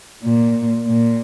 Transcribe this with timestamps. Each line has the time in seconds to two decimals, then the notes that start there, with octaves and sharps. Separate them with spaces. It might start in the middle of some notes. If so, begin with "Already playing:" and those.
0.24 A#2
0.86 A#2